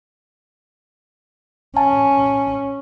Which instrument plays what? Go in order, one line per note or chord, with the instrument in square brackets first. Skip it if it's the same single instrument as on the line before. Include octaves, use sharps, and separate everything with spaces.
[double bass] C#4 [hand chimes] G#5 A5